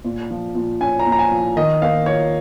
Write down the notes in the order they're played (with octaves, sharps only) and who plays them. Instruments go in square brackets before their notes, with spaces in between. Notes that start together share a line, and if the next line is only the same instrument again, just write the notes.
[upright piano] A#2
F3
A#2
C#4 G#5
A#5
A#2
A#5
G#5
F3
D#3 D#5
A#3 F5
F4 C#5